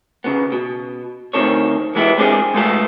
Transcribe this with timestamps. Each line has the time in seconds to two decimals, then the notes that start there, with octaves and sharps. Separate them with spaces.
0.24 C#3 B3
0.52 B2
1.33 D2 D#3 E3 C4 A4 C#5
1.95 E3 G#3 B3 E4 G4
2.18 G#3 C4 D4 G4 G#4 D5
2.54 B2 G#3 A3 B3 F4 A4